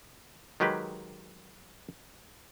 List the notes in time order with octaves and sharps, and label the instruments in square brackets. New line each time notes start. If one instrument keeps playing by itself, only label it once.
[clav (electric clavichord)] D#3 F#3 G#3 G4 B4